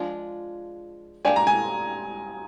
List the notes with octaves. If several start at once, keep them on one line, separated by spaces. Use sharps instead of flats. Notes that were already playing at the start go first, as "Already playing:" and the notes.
Already playing: F3 G#3 D4 F4
A#3 D4 G4 D5 G#5
A#5
G#5